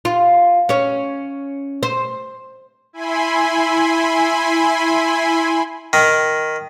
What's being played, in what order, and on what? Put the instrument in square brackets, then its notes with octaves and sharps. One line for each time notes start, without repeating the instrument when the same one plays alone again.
[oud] F4
C#4 C#5
C5
[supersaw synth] E4 G#5 B5 C6
[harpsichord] D#3